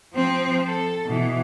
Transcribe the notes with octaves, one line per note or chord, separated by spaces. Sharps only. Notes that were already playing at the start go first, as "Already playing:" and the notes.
F3 C4
A4
B2 E3